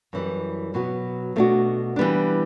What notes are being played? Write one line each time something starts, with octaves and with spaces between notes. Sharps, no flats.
F#2 E3 G3
B2 F#3 B3 F#4
B2 A3 D4 F#4
E3 G3 B3 D4